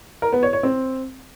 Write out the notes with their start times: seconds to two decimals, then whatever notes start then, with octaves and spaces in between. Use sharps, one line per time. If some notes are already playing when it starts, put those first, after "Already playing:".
0.22 A#4
0.32 B3
0.43 C#5
0.53 C#5
0.63 C4